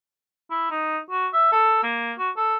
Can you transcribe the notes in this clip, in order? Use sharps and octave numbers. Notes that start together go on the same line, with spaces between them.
E4
D#4
F#4
E5
A4
A#3
F#4
A4